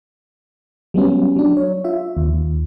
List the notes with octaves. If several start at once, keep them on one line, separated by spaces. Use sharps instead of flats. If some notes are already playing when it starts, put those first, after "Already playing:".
F#3 G3 B3 C#4
F#3 D4
C#5
F4 E5
D#2